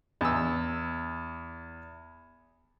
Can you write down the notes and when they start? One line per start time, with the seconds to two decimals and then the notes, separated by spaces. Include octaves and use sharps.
0.21 E2 E6